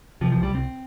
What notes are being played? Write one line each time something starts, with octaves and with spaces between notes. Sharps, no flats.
C3 F3
F3
C2
G3
C2 C4